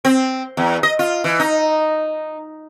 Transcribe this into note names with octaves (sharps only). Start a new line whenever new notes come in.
C4
E2
D#5
F4
E3
D#4